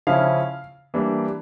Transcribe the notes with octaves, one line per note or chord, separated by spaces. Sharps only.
C#3 F3 C#4 E4 F5
E3 G3 A#3 D4